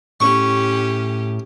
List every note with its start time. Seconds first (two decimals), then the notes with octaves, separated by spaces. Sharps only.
0.20 A2 C#4 G4 C#6